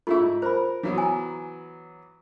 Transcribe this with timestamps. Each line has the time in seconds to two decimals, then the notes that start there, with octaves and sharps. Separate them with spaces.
0.07 A3 E4 F4 G4 G#4
0.19 G#2
0.42 A#4 C5 B5
0.83 E3 F#3 B3
0.98 G#5 A#5